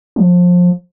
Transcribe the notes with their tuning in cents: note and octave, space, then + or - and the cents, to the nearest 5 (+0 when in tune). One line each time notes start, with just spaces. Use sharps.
F3 +25